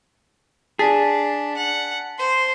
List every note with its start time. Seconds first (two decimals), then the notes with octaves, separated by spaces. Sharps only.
0.79 D4 G#4 A5 A6 B6
1.57 F#5
2.18 C5 C6